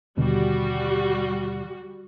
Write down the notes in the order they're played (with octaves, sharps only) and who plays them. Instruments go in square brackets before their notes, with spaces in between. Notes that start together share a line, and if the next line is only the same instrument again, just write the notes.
[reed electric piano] D#2 B2 D3 [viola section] G3 F#4